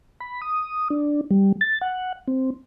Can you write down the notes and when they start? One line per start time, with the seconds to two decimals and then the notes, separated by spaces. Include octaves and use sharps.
0.21 B5
0.42 D#6
0.90 D4
1.31 G3
1.61 A6
1.81 F#5
2.28 C4